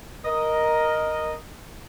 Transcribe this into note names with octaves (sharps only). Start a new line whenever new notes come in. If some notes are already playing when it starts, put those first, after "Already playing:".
A#4 D#5